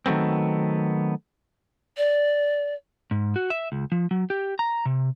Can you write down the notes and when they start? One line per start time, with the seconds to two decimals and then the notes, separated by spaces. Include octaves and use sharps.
0.06 D#3 F#3 A3 B3 C4
1.97 D5
3.11 G#2
3.36 F#4
3.50 E5
3.72 C#2
3.92 F3
4.11 F#3
4.30 G4
4.59 A#5
4.86 C3